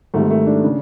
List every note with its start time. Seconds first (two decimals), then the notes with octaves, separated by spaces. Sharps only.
0.14 G#1 G#2 D#3 G3 A3
0.31 A3
0.46 D4
0.64 C#3